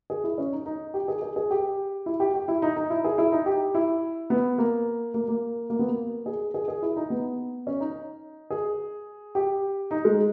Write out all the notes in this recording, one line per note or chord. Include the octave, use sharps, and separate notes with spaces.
G#4
E4
C#4
D#4
D#4
G4
G#4
G#4
G#4
G4
E4
G4
G4
E4
D#4
D#4
E4
G#4
E4
D#4
G4
E4
B3
A#3
A#3
A#3
A#3
B3
A#3
G#4
G#4
G#4
E4
D#4
B3
C#4
D#4
G#4
G4
D#4
G#3